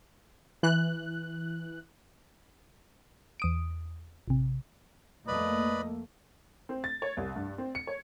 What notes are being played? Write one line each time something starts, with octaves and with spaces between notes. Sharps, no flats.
E3 F#6
E2 D#6 D7
A1 C3
F2 A3 A#3 B4 D5 D#5 B5
C4
A6
C#5
C2
G2
C4
C#7
C#5